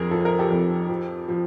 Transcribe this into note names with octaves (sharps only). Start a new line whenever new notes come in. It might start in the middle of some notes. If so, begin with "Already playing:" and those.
Already playing: F2 G#4 A#4
F3 A4
A#4
G4 A4
F2
F3
F3